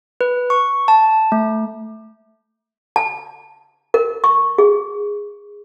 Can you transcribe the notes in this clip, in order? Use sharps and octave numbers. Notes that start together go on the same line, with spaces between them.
B4
C#6
A5
A3
A5
A#4
C#6
G#4